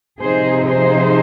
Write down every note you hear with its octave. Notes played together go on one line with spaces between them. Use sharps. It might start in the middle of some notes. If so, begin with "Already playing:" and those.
C3 F3 C4 D#4 G#4 C5
G#4 C5